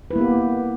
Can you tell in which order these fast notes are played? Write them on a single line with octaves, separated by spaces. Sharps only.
B4 E4 A#3 B3 G4